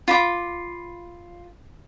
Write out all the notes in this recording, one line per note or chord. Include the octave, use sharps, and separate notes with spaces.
F4 B5 D6